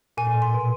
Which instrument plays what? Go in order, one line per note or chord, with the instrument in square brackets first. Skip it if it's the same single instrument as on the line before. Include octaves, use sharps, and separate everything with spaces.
[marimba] A#2 [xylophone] G#5
[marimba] A2
A#2
[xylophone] C6
[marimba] B2